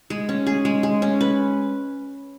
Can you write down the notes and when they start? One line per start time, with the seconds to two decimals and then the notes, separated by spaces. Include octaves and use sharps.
0.10 G#3
0.29 C#4
0.46 G#4
0.65 G#3
0.83 G#3
1.02 C#4
1.21 B4